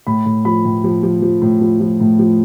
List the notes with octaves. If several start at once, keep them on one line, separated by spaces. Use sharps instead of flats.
A2 B5
A2
F3 B5
A2
F3
F3
F3
A2
F3
F3
A2
F3